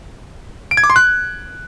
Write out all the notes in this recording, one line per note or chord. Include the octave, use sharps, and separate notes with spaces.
D7
G#6
D6
C6
F#6